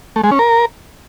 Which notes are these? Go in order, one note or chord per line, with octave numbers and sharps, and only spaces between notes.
A3
G#3
C#4
A#4